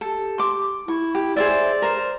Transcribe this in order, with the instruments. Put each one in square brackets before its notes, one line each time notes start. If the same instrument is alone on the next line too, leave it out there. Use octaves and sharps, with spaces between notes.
[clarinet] G4 [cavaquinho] A4
[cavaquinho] C6 D6
[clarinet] E4 [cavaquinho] C#6
[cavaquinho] G4
[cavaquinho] G#4 C5 E5 [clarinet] D5
[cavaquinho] A#4 C5